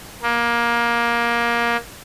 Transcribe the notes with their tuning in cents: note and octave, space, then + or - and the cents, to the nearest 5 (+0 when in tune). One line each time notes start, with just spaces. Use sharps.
A#3 +20